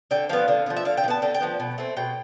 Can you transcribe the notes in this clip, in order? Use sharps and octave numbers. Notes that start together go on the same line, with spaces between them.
D3 G5
F3 B3 F5
D3
F3 B3
E5
D3 F5
G5
F3
B3 A5
D3 G5
G5
F3 B3
B2
A3 C4
B2 G5